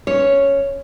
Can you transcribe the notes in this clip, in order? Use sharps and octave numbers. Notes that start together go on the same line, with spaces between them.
C#4 C#5